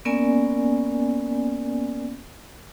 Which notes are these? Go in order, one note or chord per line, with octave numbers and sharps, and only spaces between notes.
A#3 B3 C#4 A#4 D5 G#5